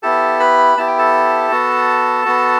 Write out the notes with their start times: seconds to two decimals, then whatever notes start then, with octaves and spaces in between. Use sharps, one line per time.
0.03 B3 E4 G4 A4 A5
0.40 B4 B5
0.77 B3 E4 G4 A5
0.88 G5
0.99 A4 A5
1.52 B3 F#4
2.26 B3 F#4